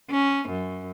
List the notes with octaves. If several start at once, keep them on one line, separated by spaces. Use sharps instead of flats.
C#4
F#2